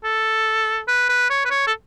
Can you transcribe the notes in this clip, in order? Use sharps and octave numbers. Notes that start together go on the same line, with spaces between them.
A4
B4
B4
C#5
B4
C#5
A4